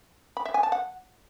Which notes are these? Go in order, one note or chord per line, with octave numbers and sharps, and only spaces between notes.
B5
E5
G#5
A5
F#5